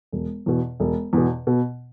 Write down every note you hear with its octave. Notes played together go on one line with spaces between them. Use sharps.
E1
E2 B2
E1
E2 B2
B2